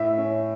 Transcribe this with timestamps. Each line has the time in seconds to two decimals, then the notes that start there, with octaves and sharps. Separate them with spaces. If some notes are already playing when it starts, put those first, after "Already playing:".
Already playing: A2 E5
0.18 C#4